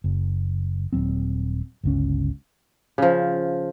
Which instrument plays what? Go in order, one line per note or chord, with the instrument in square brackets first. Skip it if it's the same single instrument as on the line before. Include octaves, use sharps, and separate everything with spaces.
[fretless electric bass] F#1
D#1 F#3 C4
G1 C#2 C#4
[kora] C#3 F3